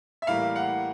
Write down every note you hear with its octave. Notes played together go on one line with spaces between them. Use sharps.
E5
A2 E3 G3 A#3 F5
F#5